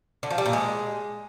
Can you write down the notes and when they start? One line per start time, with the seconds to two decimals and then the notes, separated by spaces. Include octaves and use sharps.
0.23 D3
0.31 F3
0.38 G3
0.46 A#2
0.53 G#3